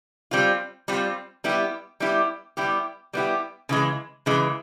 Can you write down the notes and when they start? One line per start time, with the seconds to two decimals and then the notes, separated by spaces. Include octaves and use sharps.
0.31 G3 C4 F4
0.88 G3 C4 F4
1.44 G3 B3 E4 G4
2.00 G3 B3 E4 G4
2.57 G3 B3 E4 G4
3.13 G3 B3 E4 G4
3.69 C#3 E3 G#3
4.26 C#3 E3 G#3